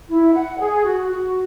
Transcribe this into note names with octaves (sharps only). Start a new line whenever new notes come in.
E4
F#5
G#4
F#4
F#4